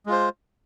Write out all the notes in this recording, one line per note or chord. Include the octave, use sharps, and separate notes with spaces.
G#3 F4 C5